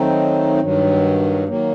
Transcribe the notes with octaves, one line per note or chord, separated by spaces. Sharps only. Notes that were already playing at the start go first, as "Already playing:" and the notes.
Already playing: D#3 F#3 A3 C4 D#4
G2 D#3 F#3
D#3 F#3 A#3